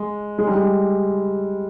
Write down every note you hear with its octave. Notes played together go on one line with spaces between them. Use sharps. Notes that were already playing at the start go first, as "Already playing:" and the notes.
Already playing: G#3
G#3
G3
G#3